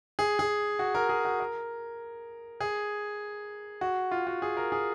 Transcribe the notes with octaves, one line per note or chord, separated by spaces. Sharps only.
G#4
G#4
F#4
A#4
G#4
F#4
A#4
G#4
F#4
F4
F#4
G#4
A#4
G#4